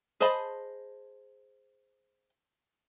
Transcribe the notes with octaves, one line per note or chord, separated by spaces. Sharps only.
G#4 C5 D#5 A5 B5